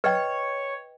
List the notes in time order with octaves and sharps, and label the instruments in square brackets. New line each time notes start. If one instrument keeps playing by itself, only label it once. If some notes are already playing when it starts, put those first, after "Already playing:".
[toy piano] B4 D#5 G5 [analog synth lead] C#5